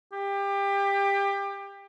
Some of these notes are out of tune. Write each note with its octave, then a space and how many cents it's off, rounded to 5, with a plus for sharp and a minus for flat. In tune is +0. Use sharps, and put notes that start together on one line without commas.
G4 +25